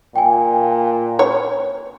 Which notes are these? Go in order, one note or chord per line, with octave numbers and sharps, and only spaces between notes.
A#2 G5 G#5
C#5